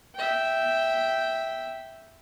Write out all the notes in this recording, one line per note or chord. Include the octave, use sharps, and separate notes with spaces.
E5 G5